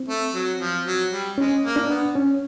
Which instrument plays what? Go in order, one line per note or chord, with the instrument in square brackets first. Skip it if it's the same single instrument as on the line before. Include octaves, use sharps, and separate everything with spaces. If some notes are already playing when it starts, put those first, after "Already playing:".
Already playing: [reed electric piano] C4
[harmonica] A3
F#3
F3
F#3
G3
[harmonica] G#3 [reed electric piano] C#4
[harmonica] A#3
[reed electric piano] D4
[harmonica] B3
[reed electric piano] C#4